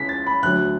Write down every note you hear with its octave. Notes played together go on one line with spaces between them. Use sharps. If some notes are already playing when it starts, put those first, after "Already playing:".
Already playing: C#2 C#3 C#4 E4 B6
A6
B5
D2 D3 F#3 F#6